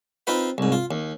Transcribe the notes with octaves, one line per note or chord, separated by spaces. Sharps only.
C4 D#4 F4 B4 F5
C2 G#2
F4
D#2